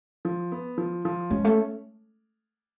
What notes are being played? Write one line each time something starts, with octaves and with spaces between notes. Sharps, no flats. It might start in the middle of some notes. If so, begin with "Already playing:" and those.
F3
B3
F3
F3
G#3 C#4
A3